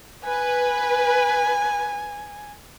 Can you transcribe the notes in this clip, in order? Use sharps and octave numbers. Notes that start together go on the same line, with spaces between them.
B4 G#5